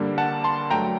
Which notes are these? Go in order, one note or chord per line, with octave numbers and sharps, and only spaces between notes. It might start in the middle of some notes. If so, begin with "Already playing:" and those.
Already playing: G2 D3 G3 A#3
F#5 A5
A5 C6
G2 F#3 A3 G5 A#5